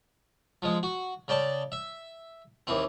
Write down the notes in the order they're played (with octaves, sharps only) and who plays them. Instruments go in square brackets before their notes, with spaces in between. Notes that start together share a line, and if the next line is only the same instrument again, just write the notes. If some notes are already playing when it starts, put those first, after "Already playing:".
[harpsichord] F3 G#3
F#4
C#3 D5 G5 A5
E5
D#2 E3 C4